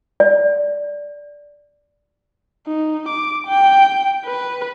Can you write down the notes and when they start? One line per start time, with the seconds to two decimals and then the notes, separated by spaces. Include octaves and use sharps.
0.20 D5
2.67 D#4
3.09 D6
3.48 G5
4.25 B4